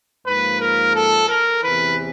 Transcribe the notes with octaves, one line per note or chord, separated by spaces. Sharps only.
G#2 F3 A#3 B4
A#4
A4
A#4
E2 C3 E3 B4